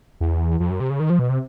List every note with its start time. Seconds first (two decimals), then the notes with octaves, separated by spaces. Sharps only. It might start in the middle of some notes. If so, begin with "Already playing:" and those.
0.20 E2
0.60 F2
0.70 F#2
0.80 C3
0.90 C#3
1.00 D#3
1.10 F3
1.19 B2
1.30 C3